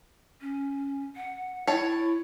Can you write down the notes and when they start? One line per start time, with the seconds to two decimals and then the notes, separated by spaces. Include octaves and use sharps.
0.41 C#4
1.16 F#5
1.67 E4 C#5 A5